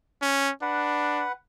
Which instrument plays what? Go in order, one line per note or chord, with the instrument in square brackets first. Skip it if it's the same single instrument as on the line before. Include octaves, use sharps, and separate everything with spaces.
[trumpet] C#4
[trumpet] D4 [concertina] B4 F#5